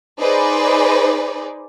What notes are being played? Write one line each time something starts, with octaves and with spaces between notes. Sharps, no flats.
D#4 G#4 B4 C5 D5